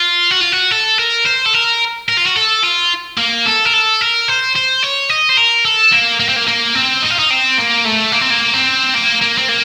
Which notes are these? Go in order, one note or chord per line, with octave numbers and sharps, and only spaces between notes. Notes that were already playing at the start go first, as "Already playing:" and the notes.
Already playing: F4
F#4
F4
F#4
A4
A#4
C5
A4
A#4
A#4
F4
F#4
A4
F4
A#3
A4
A#4
A4
A#4
C5
C5
C#5
D#5
C5
A#4
A4
A#3
A#3
C4
A#3
A#3
C4
D#4
F4
D#4
C4
A#3
A3
A#3
C4
A#3
C4
A#3
A#3
C4
A#3